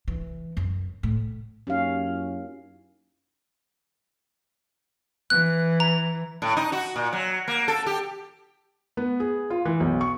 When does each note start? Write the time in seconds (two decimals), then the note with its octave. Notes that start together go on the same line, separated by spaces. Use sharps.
0.08 E3
0.57 F#2
1.03 A2
1.67 F#2 A#3 C#4 D#4 G4 F5
2.06 E4
5.30 E3 F#6
5.80 A#5
6.42 A2
6.57 D#4
6.72 F#4
6.96 A#2
7.13 F#3
7.48 A#3
7.68 A4
7.86 G4
8.97 B3
9.20 G#4
9.50 F4
9.65 E3
9.80 B1
10.01 C#6